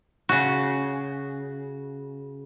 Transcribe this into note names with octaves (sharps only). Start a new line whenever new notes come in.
C#3 F#4